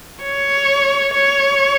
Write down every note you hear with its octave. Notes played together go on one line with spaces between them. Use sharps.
C#5
C#5